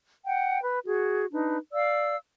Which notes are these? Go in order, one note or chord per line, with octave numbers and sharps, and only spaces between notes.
F#5 G5
B4
F#4 G#4
D4 D#4 B4
D5 F5 E6